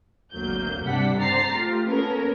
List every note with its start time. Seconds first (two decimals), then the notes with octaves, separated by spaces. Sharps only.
0.33 G#1 D2 F#3 A#3 G6
0.83 G2 C3 G3 D4 F#5 B6
1.18 C4 D4 C5 A#5 A6 C7
1.52 A3 F4 G4
1.87 A#3 B3 C#4 A4 A#4 C#5